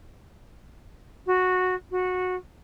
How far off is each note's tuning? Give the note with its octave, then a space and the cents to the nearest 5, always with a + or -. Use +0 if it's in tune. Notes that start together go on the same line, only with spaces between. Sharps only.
F#4 -10
F#4 -15